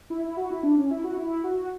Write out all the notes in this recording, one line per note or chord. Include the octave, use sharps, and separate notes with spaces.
E4
E4
F#4
E4
D4
C#4
E4
F#4
E4
F#4